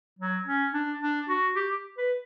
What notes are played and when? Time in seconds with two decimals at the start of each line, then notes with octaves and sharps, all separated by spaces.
0.19 F#3
0.46 C#4
0.73 D4
1.01 D4
1.29 F#4
1.56 G4
1.97 B4